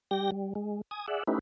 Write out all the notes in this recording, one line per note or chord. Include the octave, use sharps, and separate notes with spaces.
G3 G4 G5 A#6
G3
G#3
G#5 D#6
G#4 D5 E5 F#5
A3 C#4 D#4 E4 G4 B4